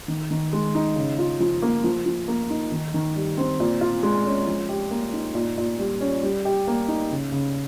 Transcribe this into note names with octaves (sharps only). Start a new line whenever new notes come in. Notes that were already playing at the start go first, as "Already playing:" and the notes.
D#3
D#3
G#3
D#4
C#3
F4
F3
A#3
F3
F3
A#3
D#4
D#3
D#3
G3
C4
A#2
F4
G#3
C#4
F3
G4
A#3
D#4
A#2
A#2
G3
C#4
G3
G4
A#3
D#4
C#3
C#3